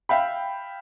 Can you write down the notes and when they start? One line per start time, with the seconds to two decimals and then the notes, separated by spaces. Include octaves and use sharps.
0.09 E5 F5 G5 B5